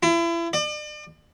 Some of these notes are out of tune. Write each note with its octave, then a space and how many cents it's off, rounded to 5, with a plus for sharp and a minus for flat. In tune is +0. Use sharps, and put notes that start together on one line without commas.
E4 +35
D5 +40